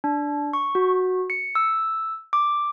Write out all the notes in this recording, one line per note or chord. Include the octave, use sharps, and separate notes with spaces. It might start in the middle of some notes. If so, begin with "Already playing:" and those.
D4
C#6
F#4
C#7
E6
D6